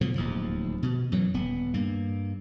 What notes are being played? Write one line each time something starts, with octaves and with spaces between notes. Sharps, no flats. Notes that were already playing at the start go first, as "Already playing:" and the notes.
B2 D3 F3
D1 D#2 F3
B2
F#2 E3 F#3
D#1 B3
G2 A#3